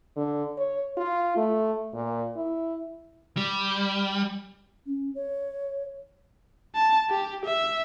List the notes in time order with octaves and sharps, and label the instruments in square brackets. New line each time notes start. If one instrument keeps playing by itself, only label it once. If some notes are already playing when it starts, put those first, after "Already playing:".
[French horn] D3
C#5
F4
A3
A#2
E4
[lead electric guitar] G3
[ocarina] C#4
C#5
[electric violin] A5
G4
E5